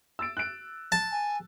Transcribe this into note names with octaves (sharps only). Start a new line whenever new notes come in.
E6 A6 D7
F#6 D7
A5
G#5